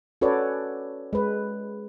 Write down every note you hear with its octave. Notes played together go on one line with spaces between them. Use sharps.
C#4 F#4 A4 B4 C#5 D5
G#3 B4